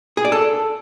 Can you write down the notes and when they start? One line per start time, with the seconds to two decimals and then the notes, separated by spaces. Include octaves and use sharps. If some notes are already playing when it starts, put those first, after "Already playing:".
0.17 G#4
0.25 D5
0.32 A4